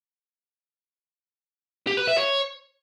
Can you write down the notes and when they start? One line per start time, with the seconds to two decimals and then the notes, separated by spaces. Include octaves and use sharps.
1.87 G4
1.97 B4
2.07 E5
2.18 C#5